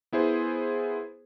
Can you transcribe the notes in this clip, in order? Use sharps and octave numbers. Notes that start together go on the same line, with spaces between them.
B3 E4 G#4 C5